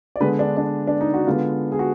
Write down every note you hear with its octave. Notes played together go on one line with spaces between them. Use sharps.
D5
D3 G#3 B3 B4
D4
D4
D4
D#4
F#4
D3 G#3 B3 F4
G#4
F#4